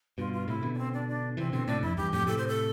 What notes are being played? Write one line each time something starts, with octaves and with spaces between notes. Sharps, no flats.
G2 B2 F4
F4
A2 C3 E4
B2 D3
D4
C4
D4
D4
C3 E3 C4
B2 D3 C4
A2 C3 D4
F2 E4
E2 G2 G4
F2 A2 G4
A2 C3 A4
C5
A4